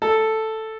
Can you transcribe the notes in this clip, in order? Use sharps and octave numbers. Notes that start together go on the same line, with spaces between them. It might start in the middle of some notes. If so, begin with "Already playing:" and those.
A4